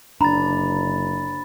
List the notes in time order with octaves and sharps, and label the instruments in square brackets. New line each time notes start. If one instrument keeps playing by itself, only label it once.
[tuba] F#1 [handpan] D4 [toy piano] A#5 [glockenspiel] B5 A6